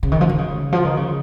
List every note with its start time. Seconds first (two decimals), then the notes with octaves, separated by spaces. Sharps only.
0.03 C#3
0.12 D#3
0.21 F3
0.29 D#3
0.38 C#3
0.73 F3
0.85 D#3
0.97 C#3